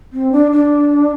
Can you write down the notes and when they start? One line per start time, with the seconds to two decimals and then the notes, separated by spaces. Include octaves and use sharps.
0.13 C4
0.32 D4
0.52 D4